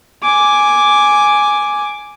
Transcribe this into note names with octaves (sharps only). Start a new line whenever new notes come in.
G#5 D6